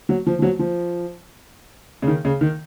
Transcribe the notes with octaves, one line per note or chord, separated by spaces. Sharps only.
F#3
F3
F3
F#3
F3
C#3
D#3
C#3
D#3